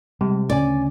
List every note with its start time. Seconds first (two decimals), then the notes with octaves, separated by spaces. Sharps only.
0.21 C3 G3 G#3
0.50 D2 C#3 C#4 D5 G#5